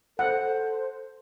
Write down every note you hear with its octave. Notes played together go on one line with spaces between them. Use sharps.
A4 C5 F#5